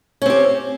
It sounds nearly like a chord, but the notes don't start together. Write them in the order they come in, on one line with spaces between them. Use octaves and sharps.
C#4 C4 G4